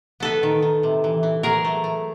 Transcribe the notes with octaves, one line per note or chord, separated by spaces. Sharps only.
B3 A4 B4
D#3
D#3
C3
E3
E3
F#3 G#4 A#4
A3
A3